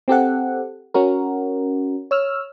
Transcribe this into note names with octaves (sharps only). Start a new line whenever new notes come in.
C4 G4 A4 F#5
C#4 F#4 A#4
C#5 E6 F6